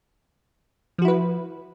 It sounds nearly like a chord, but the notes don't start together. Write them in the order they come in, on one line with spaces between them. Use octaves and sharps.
F3 F#4 E4 B4